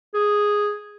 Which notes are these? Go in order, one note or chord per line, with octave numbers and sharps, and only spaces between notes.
G#4